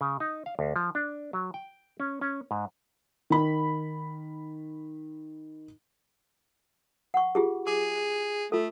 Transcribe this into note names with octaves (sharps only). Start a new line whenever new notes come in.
C#3
D#4
F5
D2
F3
D4
F#3
G5
C#4
C#4
G#2
D#3 B5
F#5 C#6
F4 G4 G#4
G#4 D6
A3 F4 A4